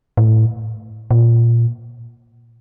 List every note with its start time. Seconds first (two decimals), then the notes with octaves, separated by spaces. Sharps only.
0.17 A2
1.11 A#2